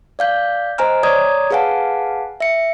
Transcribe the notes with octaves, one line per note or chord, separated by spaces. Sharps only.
D5 F5 G6
C5 D#5 G#5 A#5 F6
C#5 D5 A#5 D#6 G#6
G#4 B4 F5 F#5 G#5 A5
E5 C#7